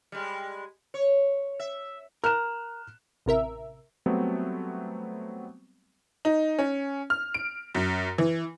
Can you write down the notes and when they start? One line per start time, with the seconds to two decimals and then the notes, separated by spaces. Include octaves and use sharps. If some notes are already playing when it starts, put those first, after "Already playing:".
0.12 G3 G#3
0.94 C#5
1.59 E5
2.24 A#4 F6 F#6 E7
3.26 A1 C3 A#4 E5
4.06 F#3 G3 A3 B3 C4
6.25 D#4
6.59 C#4
7.10 F6
7.34 D7
7.75 F#2
8.18 E3